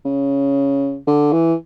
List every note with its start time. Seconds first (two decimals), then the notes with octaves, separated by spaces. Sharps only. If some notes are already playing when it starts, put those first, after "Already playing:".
0.05 C#3
1.07 D3
1.33 E3